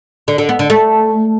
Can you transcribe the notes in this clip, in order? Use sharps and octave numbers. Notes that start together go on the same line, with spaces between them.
D3
D3
B3
D3
A3